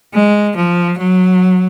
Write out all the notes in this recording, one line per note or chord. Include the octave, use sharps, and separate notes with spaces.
G#3
F3
F#3